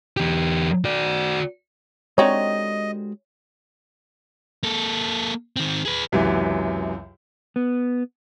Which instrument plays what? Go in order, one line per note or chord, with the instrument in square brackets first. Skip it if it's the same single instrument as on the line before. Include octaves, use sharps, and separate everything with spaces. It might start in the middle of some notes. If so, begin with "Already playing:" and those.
[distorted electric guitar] E2 G4
F#4 D5
[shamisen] D3 C4 D#4 [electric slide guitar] G#3 F#4 G4 [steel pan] C#5 [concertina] D#5
[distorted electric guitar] A#3 A4
D#3 C4
G#4 B4
[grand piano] C#2 F#2 C3 E3 F#3
[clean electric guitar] B3